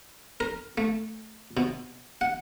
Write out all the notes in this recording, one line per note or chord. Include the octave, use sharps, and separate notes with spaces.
A#4
A3
B2
F#5